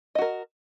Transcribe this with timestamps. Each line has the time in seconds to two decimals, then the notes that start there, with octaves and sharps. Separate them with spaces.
0.15 D#5
0.18 F#4
0.22 A#4